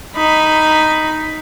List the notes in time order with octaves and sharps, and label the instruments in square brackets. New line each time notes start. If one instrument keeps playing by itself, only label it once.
[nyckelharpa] D#4 B5